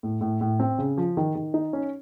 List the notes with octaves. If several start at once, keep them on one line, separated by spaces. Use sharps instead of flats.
A2
A2
A2
C4
C#3
F3
D#3
D#3
D#4
C#4